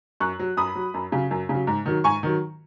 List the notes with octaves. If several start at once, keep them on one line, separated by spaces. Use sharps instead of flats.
F#2 C#6 F#6
F#3
F#2 B5 D#6
F#3
F#2
C#3 F#3
F#2
C#3 F#3
G#2
D#3 F#3
G#2 G#5 C#6
D#3 F#3